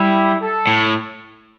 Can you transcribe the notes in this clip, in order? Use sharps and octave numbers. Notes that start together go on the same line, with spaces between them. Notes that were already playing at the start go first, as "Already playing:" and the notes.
Already playing: G3 E4
A4
A2